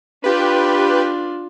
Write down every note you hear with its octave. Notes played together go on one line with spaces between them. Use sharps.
D4 F4 G4 B4